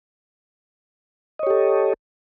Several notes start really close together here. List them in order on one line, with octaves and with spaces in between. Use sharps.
D#5 C#5 G4 A4